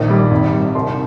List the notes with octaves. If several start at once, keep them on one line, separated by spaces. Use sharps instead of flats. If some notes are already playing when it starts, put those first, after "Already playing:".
Already playing: A#1 D#3 D#5
G3
G#1
G3
C2 C6